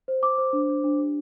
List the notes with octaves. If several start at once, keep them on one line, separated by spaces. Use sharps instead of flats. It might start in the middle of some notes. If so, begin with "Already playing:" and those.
C5
D6
C5
D4
D4
D4
G4